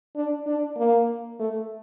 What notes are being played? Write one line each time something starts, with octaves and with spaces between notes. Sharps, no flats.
D4
D4
A#3
A3